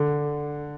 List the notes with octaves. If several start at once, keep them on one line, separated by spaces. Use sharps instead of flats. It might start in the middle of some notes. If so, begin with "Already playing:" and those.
Already playing: D3